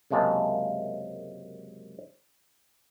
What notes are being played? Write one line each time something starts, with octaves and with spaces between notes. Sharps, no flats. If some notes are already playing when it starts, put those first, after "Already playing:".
C#2 F#2 C3 G#3 A#3 A5